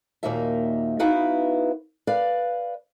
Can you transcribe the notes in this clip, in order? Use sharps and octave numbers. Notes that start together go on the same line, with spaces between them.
D#2 A#2 A#3 D#4 F#4 E5
B3 D#4 E4 F#4 B4 F5
B4 D5 F5